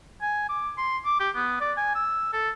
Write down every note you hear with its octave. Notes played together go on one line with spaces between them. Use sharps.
G#5
D6
C6
D6
G4
B3
D5
G#5
E6
A4